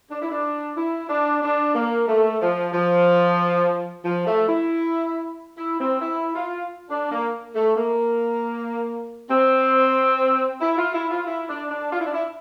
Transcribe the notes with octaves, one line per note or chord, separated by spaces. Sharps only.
D4
E4
D4
E4
D4
D4
A#3
A3
F3
F3
F3
A3
E4
E4
C4
E4
F4
D4
A#3
A3
A#3
C4
E4
F4
E4
F4
E4
D4
D4
F4
E4
D4
E4